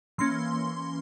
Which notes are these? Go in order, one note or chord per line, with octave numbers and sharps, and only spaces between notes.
E3 A#3 C#4 C6